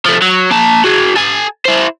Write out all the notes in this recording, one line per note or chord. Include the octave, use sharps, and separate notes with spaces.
F3 A3
F#3
A#3 A5
F#4 G#4
A4 G#5
E4 C5